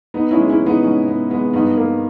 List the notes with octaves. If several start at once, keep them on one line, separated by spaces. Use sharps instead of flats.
B3 D#4
C#4 E4
G#3
C#4 E4
E3
B3 D#4
G#2 C#4
B3
G#3 B3
G2 B3 D#4
A#3